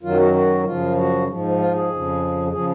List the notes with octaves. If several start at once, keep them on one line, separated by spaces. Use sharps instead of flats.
F#2 D#3 F#3 F4
F#4
F#4
F#2 C#3 F3 F4
F#4
G#2 F3
F4
G#4
F2 C#3 F3
C#3 F3 G#4